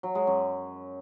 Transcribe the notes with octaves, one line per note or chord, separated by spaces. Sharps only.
F#3
G#3
F#2